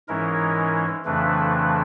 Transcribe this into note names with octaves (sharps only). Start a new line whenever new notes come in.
G#2 E3 G#3 C#4 E4 A#4
F2 C#3 E3 A3 D4 B4